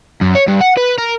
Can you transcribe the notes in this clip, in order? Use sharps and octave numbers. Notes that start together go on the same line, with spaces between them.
F#2
C#5
G2
F#5
B4
A#4